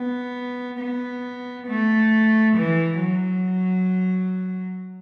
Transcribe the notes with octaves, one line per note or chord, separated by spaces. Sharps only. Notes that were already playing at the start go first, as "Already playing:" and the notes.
Already playing: B3
B3
A3
E3
F#3